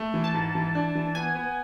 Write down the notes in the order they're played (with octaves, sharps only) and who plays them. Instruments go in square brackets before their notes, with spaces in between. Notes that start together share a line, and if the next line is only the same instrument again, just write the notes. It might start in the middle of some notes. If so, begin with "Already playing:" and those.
Already playing: [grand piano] A3
E3
[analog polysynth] A5
[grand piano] G#2
E3
D4
E3
[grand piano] B3 [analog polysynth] G#5
[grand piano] B3